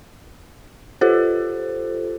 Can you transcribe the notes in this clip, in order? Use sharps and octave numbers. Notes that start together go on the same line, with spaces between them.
F4 G4 A4 C5